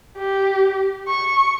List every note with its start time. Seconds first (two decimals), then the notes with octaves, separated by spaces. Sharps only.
0.17 G4
1.08 C#6